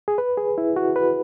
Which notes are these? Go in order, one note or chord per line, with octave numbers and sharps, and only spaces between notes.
G#4
B4
G#4
E4
F#4
B4